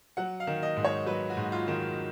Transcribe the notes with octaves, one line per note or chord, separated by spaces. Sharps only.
F#3 F#5
F5
D#3
D#5
G#2
C#5
F#3 B4
F#4
G#2
F4
D#3